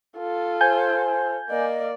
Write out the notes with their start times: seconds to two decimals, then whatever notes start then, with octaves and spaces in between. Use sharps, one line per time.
0.18 F4 A4
0.61 C5 G#5 G6
1.49 A#3 D5 D#5